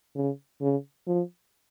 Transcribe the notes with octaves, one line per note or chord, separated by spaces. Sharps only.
C#3
C#3
F3